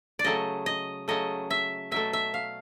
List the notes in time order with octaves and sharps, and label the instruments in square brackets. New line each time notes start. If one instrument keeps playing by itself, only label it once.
[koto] D5
C#3 F#3 A3 D#5
D#5
C#3 F#3 A3 D#5
E5
B2 F#3 A3 E5
E5
F5